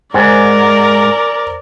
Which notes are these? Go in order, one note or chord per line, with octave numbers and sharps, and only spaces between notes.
G#2 A#4 C5 D5 G#5